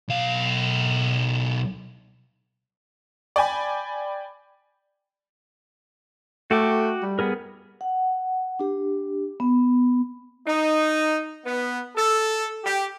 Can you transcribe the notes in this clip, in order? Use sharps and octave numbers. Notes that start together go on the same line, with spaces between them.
B1 F5
D5 G5 G#5 B5
A3 F#4 G5 D6
G3
B3 G#4 A#4
F#5
D4 G4
B3
D#4
B3
A4
G4